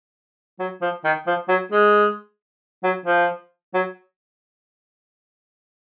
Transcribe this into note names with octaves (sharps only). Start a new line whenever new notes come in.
F#3
F3
D#3
F3
F#3
G#3
F#3
F3
F#3